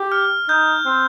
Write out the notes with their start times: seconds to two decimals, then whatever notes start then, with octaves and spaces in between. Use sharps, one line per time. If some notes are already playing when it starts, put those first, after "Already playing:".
Already playing: G4
0.12 F6
0.49 D#4 G6
0.85 C4